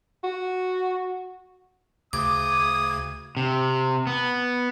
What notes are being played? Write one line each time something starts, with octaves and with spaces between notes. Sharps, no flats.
F#4
D2 C#3 D6 D#6 G#6
C3
B3